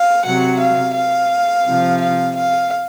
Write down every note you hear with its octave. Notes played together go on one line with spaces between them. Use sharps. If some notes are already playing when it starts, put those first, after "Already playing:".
Already playing: F5
C3 F#3 F#5
F5
F5
C3 F3
F5
F5